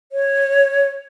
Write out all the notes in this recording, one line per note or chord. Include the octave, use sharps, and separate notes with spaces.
C#5